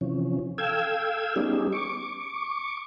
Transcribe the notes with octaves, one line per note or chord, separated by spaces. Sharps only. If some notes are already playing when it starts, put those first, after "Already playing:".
C3 E3 F3 C#4
A4 F5 G5 E6 G#6
G3 B3 C#4 D#4 G4 G#4
C#6 D6